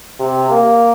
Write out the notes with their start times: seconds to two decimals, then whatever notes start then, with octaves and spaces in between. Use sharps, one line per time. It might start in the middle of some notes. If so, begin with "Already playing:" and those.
0.20 C3
0.51 A#3